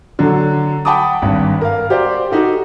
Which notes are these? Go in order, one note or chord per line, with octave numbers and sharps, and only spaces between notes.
D3 F#3 F#4 A4
F#5 G5 A5 B5 D6 D#6
G#1 G2
A#4 F5
F#4 G4 C5 D5
D#4 F#4 G4 A4